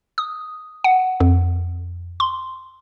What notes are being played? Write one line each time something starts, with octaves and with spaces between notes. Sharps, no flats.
D#6
F#5
F2
C6